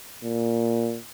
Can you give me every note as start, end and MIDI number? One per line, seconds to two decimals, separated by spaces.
0.24 0.98 46